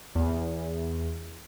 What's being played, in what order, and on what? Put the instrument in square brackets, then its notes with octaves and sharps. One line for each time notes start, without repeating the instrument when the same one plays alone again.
[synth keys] E2